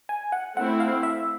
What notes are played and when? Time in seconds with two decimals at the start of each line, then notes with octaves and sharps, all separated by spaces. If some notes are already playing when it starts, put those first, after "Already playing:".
0.09 G#5
0.32 F#5
0.56 A3 C4 E4 F#5
0.80 F5
1.03 E5